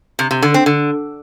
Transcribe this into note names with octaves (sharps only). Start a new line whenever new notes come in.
C3
C3
D3
C4
D3